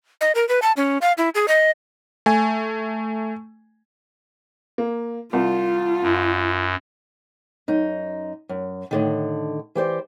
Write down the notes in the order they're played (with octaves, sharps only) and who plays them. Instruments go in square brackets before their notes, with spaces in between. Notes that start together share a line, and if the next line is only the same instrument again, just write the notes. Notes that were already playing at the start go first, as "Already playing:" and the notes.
[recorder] D#5
A#4
B4
A5
C#4
F5
E4
G#4
D#5
[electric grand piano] A3 G#5
[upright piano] A#3
[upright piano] C2 [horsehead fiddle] F4
[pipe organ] F#2
[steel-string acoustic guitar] F#2 D#4
F#2
A2 D3 D#3
E3 G4 C5 D5